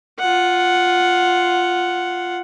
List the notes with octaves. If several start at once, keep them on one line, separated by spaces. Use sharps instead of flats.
F4 F#5